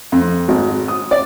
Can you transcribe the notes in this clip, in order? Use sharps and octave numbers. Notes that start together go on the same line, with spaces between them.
F2
G#1
D#6
D5